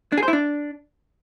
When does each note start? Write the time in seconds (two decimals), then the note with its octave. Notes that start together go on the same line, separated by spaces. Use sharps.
0.12 D4
0.17 G#4
0.23 C5
0.28 E4
0.33 D4